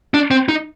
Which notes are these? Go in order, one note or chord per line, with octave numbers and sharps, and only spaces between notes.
D4
C4
D#4